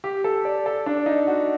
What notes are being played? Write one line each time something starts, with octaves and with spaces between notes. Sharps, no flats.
G4
A4
D5
A4
D4
D#4
F#4